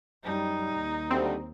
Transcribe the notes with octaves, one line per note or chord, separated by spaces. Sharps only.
F#2 G3 D#4
D#2
D2 G3 C4